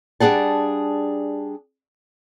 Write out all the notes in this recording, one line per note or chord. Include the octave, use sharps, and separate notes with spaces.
G3 D4 G#4 F#5 A5